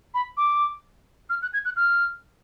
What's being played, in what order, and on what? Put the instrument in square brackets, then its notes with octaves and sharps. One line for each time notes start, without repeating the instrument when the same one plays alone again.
[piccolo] B5
D6
F6
F#6
G#6
F#6
F6